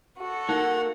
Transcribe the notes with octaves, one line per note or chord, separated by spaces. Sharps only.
F#4 A4
A#3 D#4 F#5